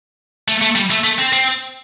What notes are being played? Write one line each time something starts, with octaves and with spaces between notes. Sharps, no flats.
A3
A3
G3
A3
A3
C4
C4